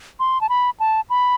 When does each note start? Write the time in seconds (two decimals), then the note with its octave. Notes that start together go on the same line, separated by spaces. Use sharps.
0.20 C6
0.41 A5
0.49 B5
0.80 A5
1.10 B5